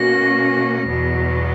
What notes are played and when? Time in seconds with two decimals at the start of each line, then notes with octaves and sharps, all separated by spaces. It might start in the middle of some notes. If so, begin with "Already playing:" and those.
Already playing: B2 A#3 C#4 F#4 A#6
0.87 E2 B2 F#3 B3